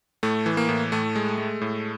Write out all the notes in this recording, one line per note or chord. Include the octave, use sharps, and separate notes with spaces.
A2 A3
E3
A#3
A2
A2 A3
G#3
G#3
A2